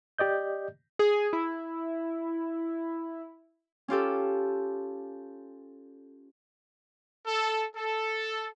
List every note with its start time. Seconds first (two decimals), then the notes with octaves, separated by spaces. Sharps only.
0.18 G4 D5 D#5 G6
0.99 G#4
1.33 E4
3.88 C#4 F4 G4 A4
7.27 A4
7.76 A4